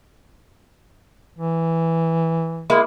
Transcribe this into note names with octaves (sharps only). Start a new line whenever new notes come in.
E3
G#3 A#3 E4